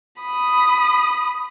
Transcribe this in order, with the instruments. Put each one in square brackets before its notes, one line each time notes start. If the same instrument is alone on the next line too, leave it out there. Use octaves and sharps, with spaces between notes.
[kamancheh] B5 D#6